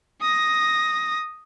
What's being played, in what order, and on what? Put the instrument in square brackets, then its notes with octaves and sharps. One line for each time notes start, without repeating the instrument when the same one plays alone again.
[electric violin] D#6 A#6